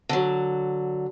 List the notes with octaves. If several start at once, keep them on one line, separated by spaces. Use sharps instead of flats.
D3 F#3